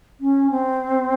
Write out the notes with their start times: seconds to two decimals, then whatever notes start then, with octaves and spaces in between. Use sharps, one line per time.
0.20 C#4
0.51 C4